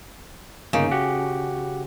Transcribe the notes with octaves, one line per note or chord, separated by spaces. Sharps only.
G1 C#3 A#3 D#4
F#4 G4 F#5